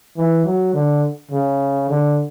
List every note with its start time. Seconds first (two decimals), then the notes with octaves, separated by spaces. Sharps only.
0.17 E3
0.45 F#3
0.74 D3
1.31 C#3
1.90 D3